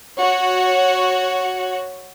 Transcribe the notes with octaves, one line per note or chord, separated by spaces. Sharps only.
F#4 C#5